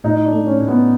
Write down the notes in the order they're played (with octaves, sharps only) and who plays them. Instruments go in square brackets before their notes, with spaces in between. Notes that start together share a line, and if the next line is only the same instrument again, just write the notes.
[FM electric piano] A2 [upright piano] D#4
[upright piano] D4
[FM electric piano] A3
[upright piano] C#4
[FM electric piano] A2
[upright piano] B3